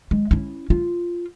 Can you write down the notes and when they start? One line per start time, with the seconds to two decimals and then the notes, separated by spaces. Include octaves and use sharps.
0.11 G#3
0.31 C#4 E4
0.70 F4